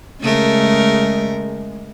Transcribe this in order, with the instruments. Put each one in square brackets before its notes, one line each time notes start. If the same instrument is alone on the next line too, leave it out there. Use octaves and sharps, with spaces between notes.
[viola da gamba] C#3 A3 A#4 [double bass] G#3